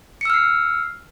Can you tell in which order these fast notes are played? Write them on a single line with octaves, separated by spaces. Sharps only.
C#7 E6 F6 C7